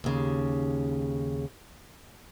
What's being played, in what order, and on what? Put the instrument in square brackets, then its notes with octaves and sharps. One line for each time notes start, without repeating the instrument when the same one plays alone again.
[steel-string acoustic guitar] D#2 C#3